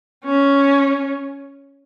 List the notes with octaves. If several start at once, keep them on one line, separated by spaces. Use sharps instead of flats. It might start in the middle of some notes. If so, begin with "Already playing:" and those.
C#4